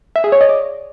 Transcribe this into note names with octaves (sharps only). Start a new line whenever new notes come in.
E5
G#4
C#5
D#5
D5